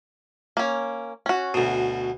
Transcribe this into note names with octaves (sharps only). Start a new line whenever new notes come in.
A#3 C#4
C#4 F#4
D2 B2